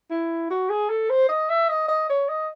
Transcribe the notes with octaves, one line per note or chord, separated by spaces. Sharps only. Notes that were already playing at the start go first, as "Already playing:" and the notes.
E4
F#4
G#4
A4
C5
D#5
E5
D#5
D#5
C#5
D#5